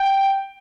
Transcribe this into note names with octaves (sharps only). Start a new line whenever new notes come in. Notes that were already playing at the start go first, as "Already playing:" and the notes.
Already playing: G5